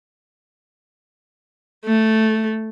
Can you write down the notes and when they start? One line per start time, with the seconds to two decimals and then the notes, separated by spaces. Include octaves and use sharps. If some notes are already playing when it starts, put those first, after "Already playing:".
1.85 A3